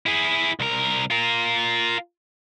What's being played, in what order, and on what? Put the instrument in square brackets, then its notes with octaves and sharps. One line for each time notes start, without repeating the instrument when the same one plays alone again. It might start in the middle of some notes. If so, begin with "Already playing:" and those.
[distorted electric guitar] E4 G#4
C2 A#4
F4 A#4